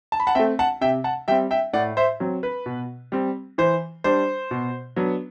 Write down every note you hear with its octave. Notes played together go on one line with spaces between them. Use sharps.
A5
B5
F#5 A5
A3 C4 E5 G5
F#5 A5
C3 E5 G5
F#5 A5
G3 C4 E5 G5
E5 G5
A2 D5 F#5
C5 E5
F#3 C4
B4
B2
G3 C4
E3 C5
G3 D4 C5
B2
F#3 B3 D4